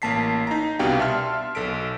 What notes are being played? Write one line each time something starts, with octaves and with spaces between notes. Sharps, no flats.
A1 A#3 A5 B6 C7
D#4 A#5
C2 B2 D4 G4 F5 G5
E5 A5 C6 F6
B1 A4 B6 D7